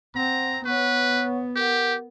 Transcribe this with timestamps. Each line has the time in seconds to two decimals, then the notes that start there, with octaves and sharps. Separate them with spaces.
0.15 C4 F#5 A#5
0.65 B3 B4 C#5 F#5 C#6
1.56 G4 A#4 F#5